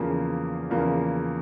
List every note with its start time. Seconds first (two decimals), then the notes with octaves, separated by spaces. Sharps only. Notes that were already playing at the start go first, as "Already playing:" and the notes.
Already playing: E2 C#3 F3 A#3
0.70 E2 C#3 F3 A#3